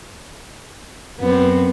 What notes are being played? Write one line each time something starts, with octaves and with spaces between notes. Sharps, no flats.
F#2 B3 C4